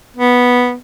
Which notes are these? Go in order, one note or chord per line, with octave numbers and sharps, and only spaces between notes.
B3